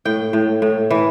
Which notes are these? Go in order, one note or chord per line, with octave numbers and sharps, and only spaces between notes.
A2 G5
A2
A2
E3